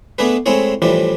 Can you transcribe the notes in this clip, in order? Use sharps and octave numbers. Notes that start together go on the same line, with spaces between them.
A3 B3 D4 G#4 B4
G#3 A3 C4 E4 G#4 C#5
A2 E3 F3 G3 D4